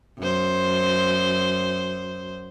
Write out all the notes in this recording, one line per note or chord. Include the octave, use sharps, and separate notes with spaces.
F#2 C5